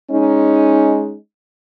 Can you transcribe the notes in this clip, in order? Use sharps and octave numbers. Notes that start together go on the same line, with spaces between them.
G#3 C#4 D#4